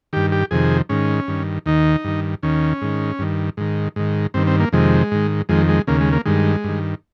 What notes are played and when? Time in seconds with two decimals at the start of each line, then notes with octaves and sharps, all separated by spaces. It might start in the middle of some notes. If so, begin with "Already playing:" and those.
0.13 G2 D#3 G4
0.32 G4
0.51 F2 C3 D#3 G#4
0.89 G#2 D#3 C#4
1.28 G2 D#3
1.66 D#2 D#3 D#4
2.04 G2 D#3
2.43 D#2 D#3 C#4
2.82 G#2 D#3
3.19 G2 D#3
3.57 G#2 D#3
3.96 G#2 D#3
4.34 G2 D#3 C4
4.47 C4
4.60 A#3
4.72 F2 C3 D#3 G#3
5.11 G#2 D#3
5.49 F2 D#3 G#3
5.68 G#3
5.87 D#2 C#3 A#3
6.01 G#3
6.12 A#3
6.26 G2 D#3 G#3
6.64 G2 D#3